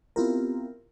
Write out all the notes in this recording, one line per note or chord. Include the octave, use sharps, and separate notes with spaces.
B3 C4 E4 F4 G4 A#4